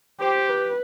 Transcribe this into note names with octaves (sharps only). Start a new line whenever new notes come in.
G4 C5
B4